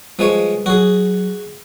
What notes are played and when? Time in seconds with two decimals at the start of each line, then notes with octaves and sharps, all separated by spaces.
0.19 F3 G3 G#3 B4 C#5
0.66 F#3 F#4 G#4